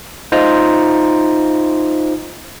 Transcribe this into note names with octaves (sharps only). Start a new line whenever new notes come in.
D#4 F4 C5 A#5